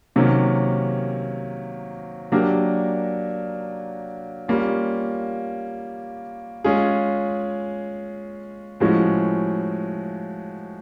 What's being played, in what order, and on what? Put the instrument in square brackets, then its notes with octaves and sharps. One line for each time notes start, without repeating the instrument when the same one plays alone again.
[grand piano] C3 D#3 F#3 A#3 C#4
F#3 A#3 D4 G4 A#4
G3 A#3 C#4 F4
G#3 C#4 F4 G#4
A2 F3 G#3 C#4 F#4